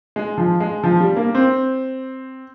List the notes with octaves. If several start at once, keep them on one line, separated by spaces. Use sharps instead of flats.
G#3
F3
G#3
F3
G3
A#3
C4